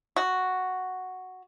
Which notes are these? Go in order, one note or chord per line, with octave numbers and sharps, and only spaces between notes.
F#4